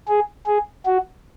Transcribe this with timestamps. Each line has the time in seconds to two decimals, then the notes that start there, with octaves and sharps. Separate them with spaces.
0.08 G#4
0.46 G#4
0.86 F#4